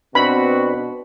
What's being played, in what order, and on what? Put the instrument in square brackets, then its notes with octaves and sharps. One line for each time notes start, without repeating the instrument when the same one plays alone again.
[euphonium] B2 [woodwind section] C4 F#4 [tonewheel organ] D4 B4 [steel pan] B5